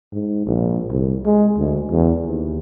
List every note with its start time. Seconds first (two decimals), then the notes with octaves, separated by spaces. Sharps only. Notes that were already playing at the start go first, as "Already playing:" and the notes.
0.12 G#2
0.46 A#1
0.90 C2
1.25 G#3
1.58 D2
1.91 E2
2.25 D#2